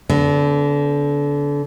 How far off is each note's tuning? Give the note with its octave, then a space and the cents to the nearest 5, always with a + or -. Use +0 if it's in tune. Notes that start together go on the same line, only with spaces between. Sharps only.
D3 -30 B3 +15